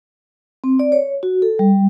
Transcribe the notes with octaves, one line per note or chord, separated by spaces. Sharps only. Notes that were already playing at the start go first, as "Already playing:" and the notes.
C4
D5
C#5
F#4
A4
G3